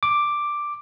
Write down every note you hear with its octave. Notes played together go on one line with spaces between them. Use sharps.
D6